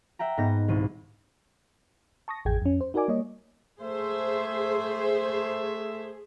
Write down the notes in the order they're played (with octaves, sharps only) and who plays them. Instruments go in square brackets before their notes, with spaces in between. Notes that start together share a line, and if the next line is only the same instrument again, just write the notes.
[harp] E5 F#5 G5 A#5
G#2 B3 D#5 G6 A#6
D#1 C2 D#7
[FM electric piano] A5 C#6 D#6 A#6
A1 F2 G#4 G5 G#6
F2 C#4
C5
D#4 F#4 A#4 D5 G#5 D6
G3 A#3 C#5 D#5
[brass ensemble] A3 E5 [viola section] G#4 [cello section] C5